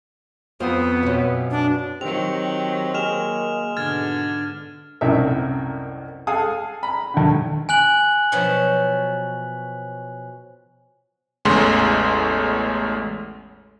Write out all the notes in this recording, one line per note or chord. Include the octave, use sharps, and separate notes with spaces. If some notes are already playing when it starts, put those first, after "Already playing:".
F2 B3 C5 D#6
F#2 B2
D4
D#3 F#3 C4 G4 F7
G#3 A#3 F6 E7 F7
G#2 B2 D3 F6 G#6 A6
C2 F#2 A2 D#4 A#4 E5
G#4 A4 F5 F#5 G#5 D#6
A#5 B5
D#2 D3
G#5 F#6 F#7
B2 F3 F#3
A1 E2 C#3 G#3 A3 C6